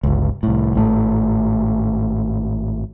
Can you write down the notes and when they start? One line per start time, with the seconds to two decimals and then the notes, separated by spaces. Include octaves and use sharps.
0.03 G1 C#2
0.43 C2 A2
0.74 G#1 A2 D#3 A3